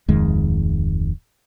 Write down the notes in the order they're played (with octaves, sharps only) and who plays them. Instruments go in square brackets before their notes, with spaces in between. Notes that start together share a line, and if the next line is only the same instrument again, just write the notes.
[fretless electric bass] D1 F2 D#3 G#3